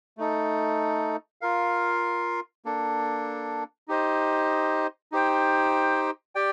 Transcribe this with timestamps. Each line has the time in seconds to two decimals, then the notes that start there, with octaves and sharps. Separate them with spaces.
0.18 A3 D#4 A4
1.41 F4 A#4 F5
2.65 A#3 D4 A4
3.88 D#4 G4 C5 D#5
5.12 D#4 G4 C5 G5
6.35 G4 D5 G5